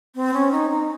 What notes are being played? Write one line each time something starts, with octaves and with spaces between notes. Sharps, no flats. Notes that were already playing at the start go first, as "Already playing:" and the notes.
C4
C#4
D#4
D#4